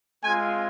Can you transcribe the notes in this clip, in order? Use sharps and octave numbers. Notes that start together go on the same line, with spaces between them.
G#3 C4 F4 G#5